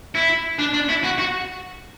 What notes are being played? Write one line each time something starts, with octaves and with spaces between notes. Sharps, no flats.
E4
D4
D4
E4
F#4
F#4